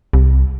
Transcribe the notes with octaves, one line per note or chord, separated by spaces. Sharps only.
C2